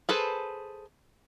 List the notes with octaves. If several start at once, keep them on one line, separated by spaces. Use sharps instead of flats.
G#4 A4 B4 C5